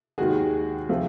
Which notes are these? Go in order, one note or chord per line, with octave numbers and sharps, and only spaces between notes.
D#2 D#3 G#3 F#4 G#4
C3 F3 A3